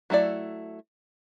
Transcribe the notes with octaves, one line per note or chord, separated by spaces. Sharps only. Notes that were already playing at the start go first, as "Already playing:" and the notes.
F#3 A3 E4 G#4 D5